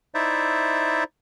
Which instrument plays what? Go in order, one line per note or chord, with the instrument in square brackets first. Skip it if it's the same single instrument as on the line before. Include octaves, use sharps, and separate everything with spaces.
[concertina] D#4 E4 C5 D5 E5